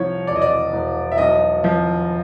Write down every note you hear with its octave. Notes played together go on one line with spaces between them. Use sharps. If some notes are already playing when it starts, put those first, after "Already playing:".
Already playing: C2 F3 C#5
E1 D5
D#5
D5
E1
E5
B1 D#5
F3